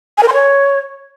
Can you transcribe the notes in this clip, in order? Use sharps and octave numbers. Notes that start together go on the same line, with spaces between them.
G#5
A#4
C6
C#5